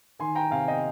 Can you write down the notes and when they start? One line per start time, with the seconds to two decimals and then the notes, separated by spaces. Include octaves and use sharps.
0.19 D#3 G#5 C6
0.35 G5 A#5
0.51 C3 F5 G#5
0.68 D#5 G5